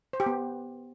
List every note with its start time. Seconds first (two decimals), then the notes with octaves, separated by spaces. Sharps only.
0.13 C5
0.20 G4
0.26 B3